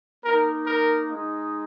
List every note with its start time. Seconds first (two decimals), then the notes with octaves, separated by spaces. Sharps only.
0.23 A#3 D#4 A#4
0.66 A#4
1.08 G#3 D#4